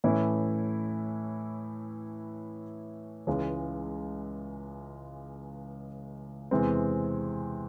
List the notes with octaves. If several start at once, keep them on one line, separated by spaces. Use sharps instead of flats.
A2 E3 A3 C#4 E4
C#2 C#3 E3 G#3 C#4
E2 C3 E3 G#3 C4